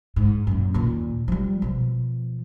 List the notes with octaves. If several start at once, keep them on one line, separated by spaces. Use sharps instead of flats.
G#2
F#2 A#2
D#2 A#2
F3 G3
B2 F3